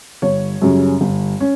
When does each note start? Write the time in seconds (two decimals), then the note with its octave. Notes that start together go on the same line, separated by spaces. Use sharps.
0.22 G1 C#5
0.62 F#2 C#3 G3 C#4
1.01 G1
1.40 C#4